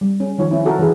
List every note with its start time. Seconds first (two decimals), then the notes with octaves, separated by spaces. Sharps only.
0.01 G3
0.20 C#4
0.38 D#3 F3 C#5
0.51 C#4 E4
0.66 F#4 A4 A#4
0.79 E3 G#4